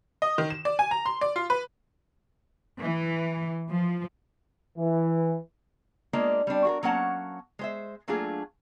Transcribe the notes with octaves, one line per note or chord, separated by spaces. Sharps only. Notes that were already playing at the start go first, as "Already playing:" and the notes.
D#5
D#3
E7
D5
G#5
A#5
C6
D5
F4
B4
E3
F3
E3
G#3 A#3 D4 F4 D5 D#5
G3 C4 D4
F#4 G#4 A#4
F#3 A#3 C#4 F#5 A5
G#3 C5 E5
F#3 A3 A#3 D4 F4 G#4